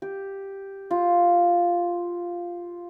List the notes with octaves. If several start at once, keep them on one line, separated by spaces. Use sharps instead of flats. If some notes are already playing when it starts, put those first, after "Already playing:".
G4
F4